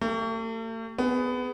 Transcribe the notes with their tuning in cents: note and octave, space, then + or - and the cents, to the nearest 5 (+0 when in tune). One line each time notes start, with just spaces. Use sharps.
A3 +45 G4 +0
B3 +20 G#4 +0